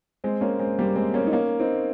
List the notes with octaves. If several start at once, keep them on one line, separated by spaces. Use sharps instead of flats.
G#3 C4
A#3 C#4
G#3 C4
G3 A#3
G#3 C4
A#3 C#4
D#4
A#3 C#4
C4 D#4